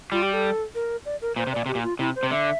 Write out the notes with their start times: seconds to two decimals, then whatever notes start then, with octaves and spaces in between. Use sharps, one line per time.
0.12 G3 F4
0.22 G4
0.33 A4
0.75 A#4
1.06 D5
1.22 A#4
1.36 A#2 C5
1.47 C3
1.52 A#2 D5
1.66 C3 G4
1.75 A#2
1.83 F4
1.99 C3 E4
2.15 C5
2.23 C3
2.30 D3 E5